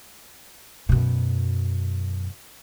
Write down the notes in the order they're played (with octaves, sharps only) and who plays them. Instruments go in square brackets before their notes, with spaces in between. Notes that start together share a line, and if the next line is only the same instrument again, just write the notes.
[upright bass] F#2 B2